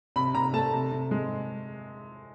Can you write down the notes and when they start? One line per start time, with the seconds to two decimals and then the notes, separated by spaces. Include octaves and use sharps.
0.16 C3 B5
0.34 C3 A#5
0.53 A3 A5
0.73 C3
0.92 C3
1.11 G#3